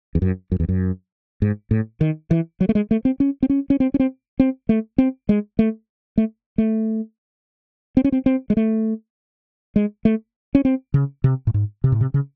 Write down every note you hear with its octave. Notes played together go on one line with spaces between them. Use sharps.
E2
F#2
F#2
E2
F#2
G#2
A2
D#3
E3
F#3
A3
G#3
A3
C4
C#4
C4
C#4
C#4
C4
C#4
C4
C4
A3
C4
G#3
A3
A3
A3
C4
C#4
C4
C4
G#3
A3
G#3
A3
C#4
C4
C#3
C3
A2
G#2
C3
A2
C3
C#3